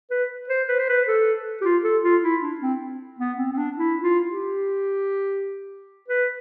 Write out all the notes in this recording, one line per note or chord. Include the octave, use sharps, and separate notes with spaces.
B4
C5
B4
C5
B4
A4
G4
F4
A4
F4
E4
D4
C4
B3
C4
C4
D4
E4
F4
G4
B4